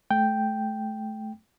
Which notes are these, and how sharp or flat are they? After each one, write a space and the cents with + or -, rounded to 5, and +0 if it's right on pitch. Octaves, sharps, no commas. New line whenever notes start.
A3 -25 G5 +0